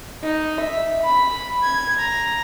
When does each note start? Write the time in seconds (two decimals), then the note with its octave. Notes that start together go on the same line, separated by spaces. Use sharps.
0.23 D#4
0.59 E5
1.03 B5
1.62 G#6
1.99 A#5